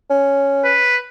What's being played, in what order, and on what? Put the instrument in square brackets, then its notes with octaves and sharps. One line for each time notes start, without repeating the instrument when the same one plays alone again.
[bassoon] C#4
[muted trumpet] B4